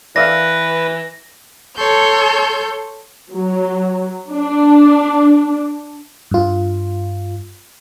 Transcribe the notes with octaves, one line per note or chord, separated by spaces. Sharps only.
E3 B4 D5 E5 F5 A#6
A4 C#5 C6 G6
F#3
D4
G2 F4